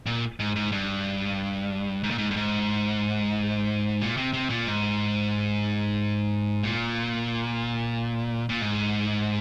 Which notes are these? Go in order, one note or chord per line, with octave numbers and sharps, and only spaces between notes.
A#2
G#2
G#2
G2
G#2
A#2
G#2
G2
G#2
A#2
C3
C3
A#2
G#2
A#2
A#2
G#2